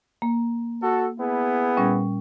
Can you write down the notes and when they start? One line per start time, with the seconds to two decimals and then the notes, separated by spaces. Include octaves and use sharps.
0.22 A#3
0.82 F#4 A4
1.18 B3 E4 G#4
1.77 A#2 G3 C#4